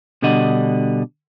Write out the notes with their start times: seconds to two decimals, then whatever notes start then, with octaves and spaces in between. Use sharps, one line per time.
0.22 B2 D3 G3 D4 D#5 F#5